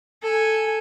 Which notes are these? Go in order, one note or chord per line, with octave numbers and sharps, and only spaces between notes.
A4 G#5